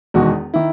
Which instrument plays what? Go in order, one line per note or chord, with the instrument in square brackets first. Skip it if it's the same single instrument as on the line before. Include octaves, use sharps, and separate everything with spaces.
[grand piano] E1 E2 D#3 G#3 F#4
D#3 E4